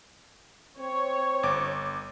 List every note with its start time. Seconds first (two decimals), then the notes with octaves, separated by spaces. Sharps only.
0.78 C4 C#5
1.43 G1 D6